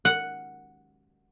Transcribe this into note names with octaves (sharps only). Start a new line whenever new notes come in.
F#5